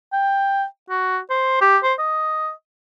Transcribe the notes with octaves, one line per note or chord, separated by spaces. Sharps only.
G5
F#4
C5
G4
C5
D#5